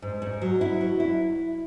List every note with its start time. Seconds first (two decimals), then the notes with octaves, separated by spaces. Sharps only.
0.02 G#2
0.22 G#2
0.42 F#3
0.61 E4
0.81 F#3
1.00 E4